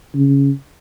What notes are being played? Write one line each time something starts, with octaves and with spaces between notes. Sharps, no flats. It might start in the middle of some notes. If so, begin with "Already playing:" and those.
C#3